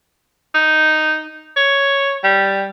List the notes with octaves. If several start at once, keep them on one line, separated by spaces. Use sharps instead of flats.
D#4
C#5
G3